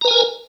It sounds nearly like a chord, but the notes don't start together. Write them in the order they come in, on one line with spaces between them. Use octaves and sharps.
A#5 B4 G#5 A#4